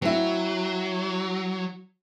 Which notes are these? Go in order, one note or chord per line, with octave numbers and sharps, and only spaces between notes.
F#3 C4 E4